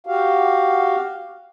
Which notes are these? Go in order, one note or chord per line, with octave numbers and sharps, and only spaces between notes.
F#4 G4 F5